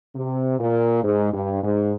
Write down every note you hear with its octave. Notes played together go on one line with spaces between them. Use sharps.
C3
A#2
G#2
G2
G#2